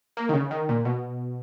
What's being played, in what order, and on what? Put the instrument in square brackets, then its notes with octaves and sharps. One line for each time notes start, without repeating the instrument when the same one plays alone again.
[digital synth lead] A#3
D#3
C#3
D#3
A#2
B2